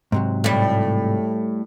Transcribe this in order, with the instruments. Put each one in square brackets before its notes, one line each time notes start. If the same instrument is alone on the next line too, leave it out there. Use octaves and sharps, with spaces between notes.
[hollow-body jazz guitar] G#2 C3 F#3
[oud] A2 G3